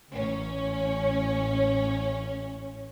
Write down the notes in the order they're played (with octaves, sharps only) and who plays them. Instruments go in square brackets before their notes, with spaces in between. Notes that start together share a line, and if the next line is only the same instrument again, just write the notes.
[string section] A1 C#4